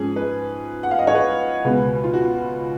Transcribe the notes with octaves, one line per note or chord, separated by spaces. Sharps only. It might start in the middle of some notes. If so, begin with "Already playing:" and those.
Already playing: G#2 F3 G#3 C#4 G#4
B4
F#5
F5
D#5
C#5
B4
C#2 B2 G#3 B3
F4
F#4